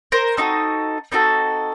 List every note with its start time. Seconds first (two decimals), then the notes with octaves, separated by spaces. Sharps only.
0.12 A#4 C5
0.37 C4 D#4 F#4 A4
1.12 C4 D#4 F#4 A4